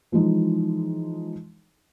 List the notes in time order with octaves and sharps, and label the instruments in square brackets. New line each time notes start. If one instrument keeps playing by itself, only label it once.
[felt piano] E3 F3 G#3 D#4